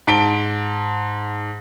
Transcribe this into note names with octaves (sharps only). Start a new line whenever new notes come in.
G#2 A5 B6 D7 G7